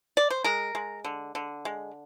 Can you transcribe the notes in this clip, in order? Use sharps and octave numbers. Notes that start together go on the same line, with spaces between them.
D5
C5
G#3 A#4
G#3
D3
D3
G#3